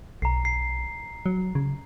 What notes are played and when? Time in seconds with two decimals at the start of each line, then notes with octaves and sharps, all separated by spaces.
0.22 B1 A#5 C7
0.45 C7
1.26 F#3
1.55 C#3